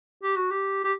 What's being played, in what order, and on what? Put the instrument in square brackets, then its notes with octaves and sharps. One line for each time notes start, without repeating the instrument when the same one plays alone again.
[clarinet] G4
F#4
G4
G4